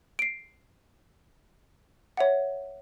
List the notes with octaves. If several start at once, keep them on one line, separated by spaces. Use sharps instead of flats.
C7 D7
C#5 E5 F#5